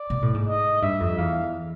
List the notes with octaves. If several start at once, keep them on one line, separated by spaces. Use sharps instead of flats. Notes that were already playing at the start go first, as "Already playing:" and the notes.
Already playing: D5
B2
A2
G#2
D#5
G2 E5
F2
E2 F5